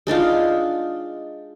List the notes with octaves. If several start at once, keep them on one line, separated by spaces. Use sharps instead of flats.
G#3 D4 D#4 F4